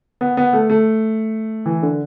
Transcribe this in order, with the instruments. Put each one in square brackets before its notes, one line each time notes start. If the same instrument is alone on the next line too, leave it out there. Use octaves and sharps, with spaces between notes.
[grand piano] B3
B3
A3
A3
E3
D3